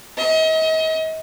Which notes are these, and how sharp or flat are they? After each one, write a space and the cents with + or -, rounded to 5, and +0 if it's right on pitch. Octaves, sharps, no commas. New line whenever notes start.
D#5 +40